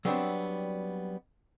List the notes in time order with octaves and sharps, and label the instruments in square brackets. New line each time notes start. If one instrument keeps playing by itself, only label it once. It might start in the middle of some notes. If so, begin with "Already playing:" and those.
[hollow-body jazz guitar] F#3 G3 B3 C4 D4